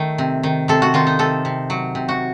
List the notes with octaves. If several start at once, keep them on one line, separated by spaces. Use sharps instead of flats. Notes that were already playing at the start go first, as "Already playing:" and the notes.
Already playing: D#3 A3
C3
D#3
C3 A4
F#4
D#3 F4
D#4
C3 A4
C3
F#3
C3
F#4